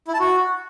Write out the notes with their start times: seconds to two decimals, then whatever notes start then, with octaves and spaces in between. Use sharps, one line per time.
0.08 E4
0.14 A5
0.20 F#4